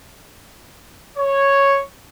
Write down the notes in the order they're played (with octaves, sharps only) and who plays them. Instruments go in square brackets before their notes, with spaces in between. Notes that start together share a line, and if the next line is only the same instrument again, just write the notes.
[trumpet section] C#5